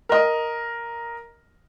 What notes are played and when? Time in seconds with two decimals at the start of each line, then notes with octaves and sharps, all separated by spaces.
0.09 A#4 D#5